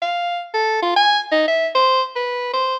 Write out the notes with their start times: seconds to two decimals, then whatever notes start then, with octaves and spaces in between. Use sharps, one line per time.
0.02 F5
0.54 A4
0.82 F4
0.96 G#5
1.32 D#4
1.48 E5
1.75 C5
2.16 B4
2.54 C5